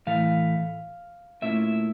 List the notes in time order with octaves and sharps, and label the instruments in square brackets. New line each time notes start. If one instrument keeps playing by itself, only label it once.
[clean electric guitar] A2 E3 A3 F5
A#2 A3 C#4 E4 E5